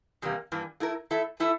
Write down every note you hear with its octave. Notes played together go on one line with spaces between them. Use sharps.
E2 C3 G3 A#3
G2 E3 A#3
A3 E4 A#4
A3 E4 A4 E5
A3 E4 A4 E5